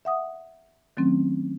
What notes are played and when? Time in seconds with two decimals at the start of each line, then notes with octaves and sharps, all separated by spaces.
0.05 E5 F#5 D#6
0.97 D#3 F#3 A3 C4 C#4